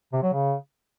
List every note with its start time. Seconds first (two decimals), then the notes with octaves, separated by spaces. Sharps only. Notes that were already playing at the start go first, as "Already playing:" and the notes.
0.13 C3
0.23 F#3
0.33 C#3